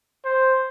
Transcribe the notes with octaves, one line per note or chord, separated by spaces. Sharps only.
C5